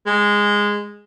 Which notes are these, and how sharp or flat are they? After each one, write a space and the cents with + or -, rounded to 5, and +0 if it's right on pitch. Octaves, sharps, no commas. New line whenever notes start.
G#3 -10